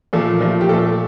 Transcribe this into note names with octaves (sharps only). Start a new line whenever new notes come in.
A#2 F3 A3 A4
A#2 F3 A3
G4
A#2 F3 A3 A4